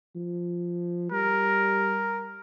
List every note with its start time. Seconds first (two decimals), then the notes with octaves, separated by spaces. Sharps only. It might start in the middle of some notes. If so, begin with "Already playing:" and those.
0.15 F3
1.12 G3 A#4